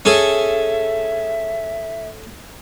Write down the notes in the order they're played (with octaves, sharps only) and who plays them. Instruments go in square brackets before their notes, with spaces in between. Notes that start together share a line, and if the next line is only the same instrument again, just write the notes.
[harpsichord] C#4 G#4 A4 [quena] E5